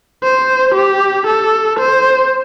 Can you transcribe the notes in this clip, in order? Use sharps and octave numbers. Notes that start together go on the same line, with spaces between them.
C5
G4
A4
C5